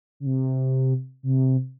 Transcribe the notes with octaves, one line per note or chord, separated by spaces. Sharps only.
C#3
C3
C3